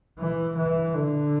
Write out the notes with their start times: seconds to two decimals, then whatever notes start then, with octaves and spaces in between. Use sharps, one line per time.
0.19 E3
0.57 E3
0.94 D3